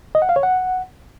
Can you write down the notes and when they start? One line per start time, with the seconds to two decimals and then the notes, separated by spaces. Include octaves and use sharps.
0.15 D#5
0.22 F#5
0.29 F5
0.36 C#5
0.43 F#5